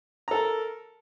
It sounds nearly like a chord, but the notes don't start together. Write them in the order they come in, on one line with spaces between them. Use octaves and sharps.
A#5 A4 A#4